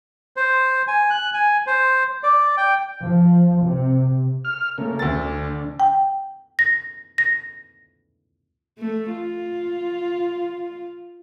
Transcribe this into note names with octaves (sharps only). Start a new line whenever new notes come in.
C5
G#5
F#6
G#5
C5
D5
G5
F3
C3
F6
C#3 A3 A#3
D2 A6
D3
G5
A#6
A#6
A3
F4